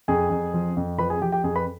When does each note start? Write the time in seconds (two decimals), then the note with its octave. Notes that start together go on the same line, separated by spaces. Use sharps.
0.08 F2 G#4 G#5
0.31 F2
0.54 F3
0.77 F2
0.98 F3 B4 B5
1.10 G#4 G#5
1.21 F3 G4 G5
1.32 G4 G5
1.44 F2 G#4 G#5
1.56 B4 B5